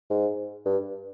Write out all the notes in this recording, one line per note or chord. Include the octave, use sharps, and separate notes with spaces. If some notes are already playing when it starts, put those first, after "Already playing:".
G#2
G2